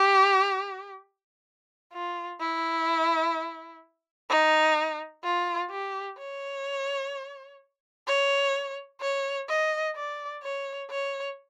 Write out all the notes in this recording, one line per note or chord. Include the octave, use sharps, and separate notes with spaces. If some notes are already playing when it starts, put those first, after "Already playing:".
Already playing: G4
F4
E4
D#4
F4
G4
C#5
C#5
C#5
D#5
D5
C#5
C#5